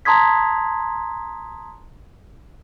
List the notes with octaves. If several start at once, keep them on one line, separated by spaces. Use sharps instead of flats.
A5 A#5 C6 D#6 G#6 B6